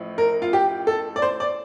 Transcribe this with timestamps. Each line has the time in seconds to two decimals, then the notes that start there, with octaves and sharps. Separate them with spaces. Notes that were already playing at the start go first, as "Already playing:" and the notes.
Already playing: A1 A2 F3
0.18 A#4
0.42 F4
0.53 G4
0.87 A4
1.16 D5
1.22 C5
1.40 D5